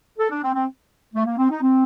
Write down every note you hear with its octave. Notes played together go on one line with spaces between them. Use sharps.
A4
D4
C4
C4
A3
A#3
C4
D#4
C4